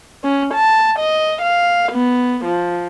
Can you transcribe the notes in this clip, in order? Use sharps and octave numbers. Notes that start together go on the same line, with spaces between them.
C#4
A5
D#5
F5
B3
F3